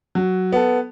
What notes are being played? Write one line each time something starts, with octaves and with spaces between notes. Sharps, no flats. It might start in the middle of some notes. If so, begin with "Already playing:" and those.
F#3
B3 A4